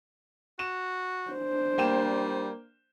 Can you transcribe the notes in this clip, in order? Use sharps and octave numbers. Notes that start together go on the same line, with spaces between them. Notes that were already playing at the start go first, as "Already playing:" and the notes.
F#4 E7
D4 C5
G3 A#3 G5 E7